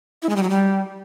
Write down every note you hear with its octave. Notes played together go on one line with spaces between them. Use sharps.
E4
G#3
G3
F#3
G3